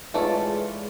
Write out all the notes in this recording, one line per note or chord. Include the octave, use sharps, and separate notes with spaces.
E3 G#3 A3 D#4 F4 C#5 D5